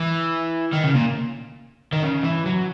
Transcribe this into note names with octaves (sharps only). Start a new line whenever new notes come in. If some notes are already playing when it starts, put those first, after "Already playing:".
Already playing: E3
D#3
C#3
A#2
D#3
C#3
E3
F#3